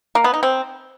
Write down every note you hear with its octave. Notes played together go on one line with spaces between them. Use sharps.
A#3
B3
D#4
C4